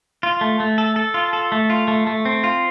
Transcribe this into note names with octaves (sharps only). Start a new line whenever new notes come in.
F4
A3
A3
A4
A4
F4
A4
A3
F4
A3
A3
C4
F4